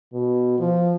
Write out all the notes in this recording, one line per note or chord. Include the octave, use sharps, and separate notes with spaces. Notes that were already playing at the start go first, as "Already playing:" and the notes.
B2
F3